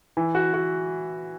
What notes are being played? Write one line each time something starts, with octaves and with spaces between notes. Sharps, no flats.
E3
F#4
F#4